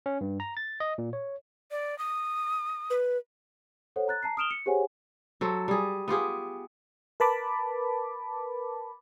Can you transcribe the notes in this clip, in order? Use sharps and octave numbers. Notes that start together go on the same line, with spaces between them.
C#4
G2
A#5
A6
D#5
A#2
C#5
D5
D#6
B4
A4 C5 C#5 F#5
A#5 F#6 A6
A5 A#5 C7
D#6 F6 D7 E7 F7 G7
C#7
G4 G#4 C5 C#5 F#5 G#5
F#3 A4 C5
G3 G#4
B3 F4 G4 G#4
A#4 B4 A5 B5 D6